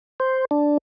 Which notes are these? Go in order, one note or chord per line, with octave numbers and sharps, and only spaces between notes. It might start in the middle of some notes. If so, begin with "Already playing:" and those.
C5
D4